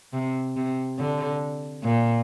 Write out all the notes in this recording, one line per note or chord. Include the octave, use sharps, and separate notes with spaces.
C3
C3
D3
A#2